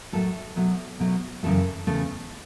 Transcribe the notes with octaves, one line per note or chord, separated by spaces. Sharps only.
A2 F#3 A3 A4
B2 F#3 A3
B2 F#3 A3
F#2 C#3 E3 A3 A4
E2 C#3 A3